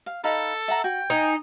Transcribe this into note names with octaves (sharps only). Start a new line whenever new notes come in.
F5
D#4 A4 F5 B5
E5 F#5 A#5
F#4 G5
D#4 G#5